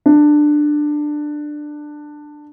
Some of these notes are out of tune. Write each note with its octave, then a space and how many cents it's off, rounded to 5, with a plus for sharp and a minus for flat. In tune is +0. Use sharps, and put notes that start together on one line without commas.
D4 +15